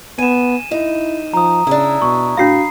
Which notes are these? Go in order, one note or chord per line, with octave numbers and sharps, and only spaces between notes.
B3 G#5 D#7 E7
D#4 E4
F3 A#5 D#6
C#3 D4 E4
B2 C#6
A2 D4 F#4 F5 B5 C7